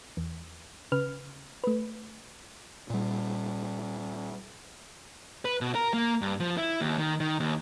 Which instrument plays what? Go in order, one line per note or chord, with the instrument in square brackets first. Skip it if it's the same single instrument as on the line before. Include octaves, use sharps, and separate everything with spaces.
[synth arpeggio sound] E2
C#3 B4 F6
A3 B4
[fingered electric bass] A#2 G3
[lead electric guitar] B4
B2
A#4
A#3
G2
F3
E4
D#2
D#3
D#3
D#2